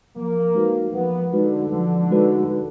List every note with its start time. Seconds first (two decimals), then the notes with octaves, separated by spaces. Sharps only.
0.16 F3 A#3
0.55 G#3 D#4 F#4 B4
0.94 F3 B3
1.33 D3 G#3 D#4 F#4 B4
1.72 F3
2.11 G#3 D#4 F#4 B4